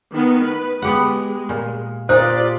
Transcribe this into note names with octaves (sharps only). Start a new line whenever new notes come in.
D#3 B3
B4
G#3 B3 G4 F#5
A#2
A#2 D#4 F4 G4 C5 D5